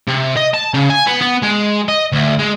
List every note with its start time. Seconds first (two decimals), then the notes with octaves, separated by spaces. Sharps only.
0.07 C3
0.36 D#5
0.54 A5
0.74 C#3
0.90 G#5
1.07 B3
1.22 B3
1.43 G#3
1.88 D#5
2.12 D2
2.39 G#3